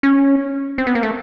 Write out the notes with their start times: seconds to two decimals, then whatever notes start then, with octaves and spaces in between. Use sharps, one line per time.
0.03 C#4
0.78 C4
0.87 B3
0.95 A#3
1.03 A3